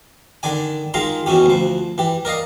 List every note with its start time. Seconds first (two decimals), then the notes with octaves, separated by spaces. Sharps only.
0.43 D3 D#3 D5 G#5
0.94 D#3 G#3 F4 A#5 C6
1.26 B2 E3 C#4 G4
1.46 D2 F3
1.98 E3 G4
2.25 A#4 D5 D#5 F5